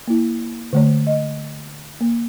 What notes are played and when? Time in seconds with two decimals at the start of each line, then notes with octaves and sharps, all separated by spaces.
0.07 A#3 E4
0.73 D3 A3 C#5
1.07 D#5
2.01 A#3